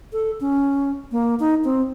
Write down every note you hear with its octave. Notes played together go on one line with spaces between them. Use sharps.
A4
C#4
A#3
D#4
C4